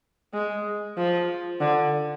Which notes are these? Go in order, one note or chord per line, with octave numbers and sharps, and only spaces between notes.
G#3
F3
D3